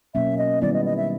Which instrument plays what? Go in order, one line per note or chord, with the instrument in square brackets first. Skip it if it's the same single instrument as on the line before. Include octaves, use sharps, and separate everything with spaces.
[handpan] B2 F#3 A#3 C#4 [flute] E5
[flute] D#5
[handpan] D#3 G3 B3 E4 [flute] D5
[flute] D#5
D#5
E5